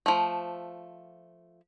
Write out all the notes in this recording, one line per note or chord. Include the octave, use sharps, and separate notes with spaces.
F3 A3